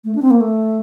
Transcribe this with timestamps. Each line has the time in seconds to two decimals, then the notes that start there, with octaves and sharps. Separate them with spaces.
0.05 A3
0.15 D4
0.22 C4
0.31 A#3
0.41 A3